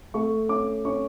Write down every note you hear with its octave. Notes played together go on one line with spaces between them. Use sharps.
A3 C#6
C#4 D6
C#4 C#6